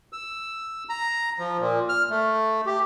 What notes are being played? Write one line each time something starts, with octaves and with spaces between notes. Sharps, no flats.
E6
A#5
F3
A#2
F6
A3
G4